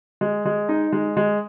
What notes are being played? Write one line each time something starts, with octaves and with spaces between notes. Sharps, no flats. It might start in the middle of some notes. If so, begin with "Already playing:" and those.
G#3
G#3
D#4
G#3
G#3